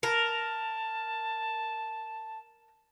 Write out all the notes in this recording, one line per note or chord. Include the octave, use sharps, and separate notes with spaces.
A#4 A5